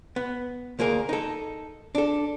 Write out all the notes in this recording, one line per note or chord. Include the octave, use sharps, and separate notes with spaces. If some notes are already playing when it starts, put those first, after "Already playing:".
B3
D2 A#3 G#4 A#4
D#4 A4
D4 A4